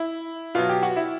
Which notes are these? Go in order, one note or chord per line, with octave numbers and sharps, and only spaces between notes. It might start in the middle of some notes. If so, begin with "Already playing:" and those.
Already playing: E4
B2 F#3 F4
G4
F#4
E4